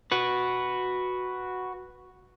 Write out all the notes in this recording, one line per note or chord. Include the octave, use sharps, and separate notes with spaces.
F#4 B4